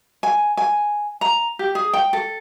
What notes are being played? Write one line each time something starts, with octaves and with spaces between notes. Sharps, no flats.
G#5
G#5
A#5
G4
G#4
G5
A4